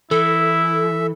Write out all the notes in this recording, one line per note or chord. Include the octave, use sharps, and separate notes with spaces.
E3 E4 A4 E5